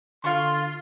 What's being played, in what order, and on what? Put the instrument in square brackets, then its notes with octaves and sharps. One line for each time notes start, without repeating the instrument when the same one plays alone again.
[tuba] D3 [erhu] F4 [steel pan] F5 C#6 [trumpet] C6